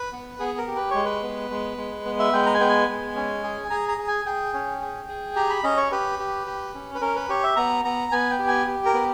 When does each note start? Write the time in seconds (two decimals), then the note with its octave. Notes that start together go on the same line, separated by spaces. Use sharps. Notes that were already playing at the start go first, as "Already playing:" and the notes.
Already playing: B4
0.13 B3
0.40 B3 G#4
0.58 A#4
0.68 G4
0.76 B4
0.91 G#3 C#5
1.05 B4
1.23 B3
1.51 G#3
1.78 G#3
2.05 B3
2.19 E5
2.33 G#3 G5
2.46 A#5
2.54 G#5
2.60 B3 G5
2.69 G#5
2.89 G#3
3.15 C#4
3.43 G#4
3.70 G#4 A#5
3.89 A#5
3.98 G#4
4.08 G#5
4.25 G#4 G5
4.53 C#4
4.82 G#4
5.09 G#4
5.35 G4 A#5
5.50 B5
5.64 C#4 D#5
5.77 C#5
5.92 G4 B4
6.19 G4
6.47 G4
6.75 C#4
6.95 B4
7.01 C#4 A#4
7.16 B4
7.29 G4 C#5
7.43 E5
7.56 B3 A#5
7.85 B3 A#5
8.12 B3 G#5
8.31 G5
8.39 G4
8.48 G#5
8.67 G4
8.85 A#4
8.94 B3